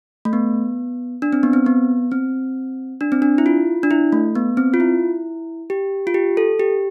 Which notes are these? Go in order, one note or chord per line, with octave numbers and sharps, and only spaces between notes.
A3
B3
D4
C4
B3
C4
B3
C4
D4
C4
D4
E4
F4
D4
E4
A3
B3
C4
F4
E4
G4
F4
G4
A4
G4